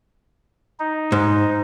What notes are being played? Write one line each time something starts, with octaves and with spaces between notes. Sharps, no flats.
D#4
G#2